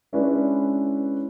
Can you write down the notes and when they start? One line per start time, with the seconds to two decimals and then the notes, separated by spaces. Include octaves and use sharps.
0.13 G#3 C#4 D4 E4 B4